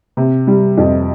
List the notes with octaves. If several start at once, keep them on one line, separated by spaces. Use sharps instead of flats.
C3
G3
F2